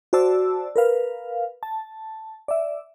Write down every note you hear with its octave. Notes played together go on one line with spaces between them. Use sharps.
F#4 C5 D5 A5 E6
A#4 B4 F5
A5
D5 E5